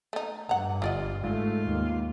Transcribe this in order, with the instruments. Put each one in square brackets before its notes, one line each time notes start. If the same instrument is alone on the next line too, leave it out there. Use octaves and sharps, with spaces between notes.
[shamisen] A3 D#4
[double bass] G2 [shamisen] F#5 A#5
[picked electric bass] G1 [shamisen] E3 D5 D#5 [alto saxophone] F4
[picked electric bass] G#2 [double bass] A3 [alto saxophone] F4
[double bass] D#2